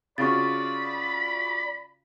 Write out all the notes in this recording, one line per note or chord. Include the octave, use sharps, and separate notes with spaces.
C#3 F4 F#4 D5 B5 C#6 A6